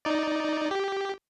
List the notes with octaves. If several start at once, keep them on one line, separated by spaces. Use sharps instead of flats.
D#4 D5
G4